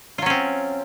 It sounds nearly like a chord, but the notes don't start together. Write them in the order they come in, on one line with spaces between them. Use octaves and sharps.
F4 F#3 C#4 C4